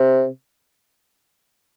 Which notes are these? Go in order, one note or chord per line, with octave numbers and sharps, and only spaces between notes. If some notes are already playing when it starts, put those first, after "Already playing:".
Already playing: C3